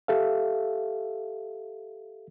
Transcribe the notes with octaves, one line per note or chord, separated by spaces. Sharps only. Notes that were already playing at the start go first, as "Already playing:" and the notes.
G4 A4 E5 F5